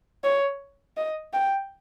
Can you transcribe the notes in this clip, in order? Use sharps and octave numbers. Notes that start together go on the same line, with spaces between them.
C#5
D#5
G5